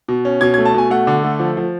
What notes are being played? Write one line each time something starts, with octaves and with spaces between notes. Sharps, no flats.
B2
C#4
B2 G#6
G#6
A3
A5
B2 G#5
A3 F#5
D3
A3
F3
F3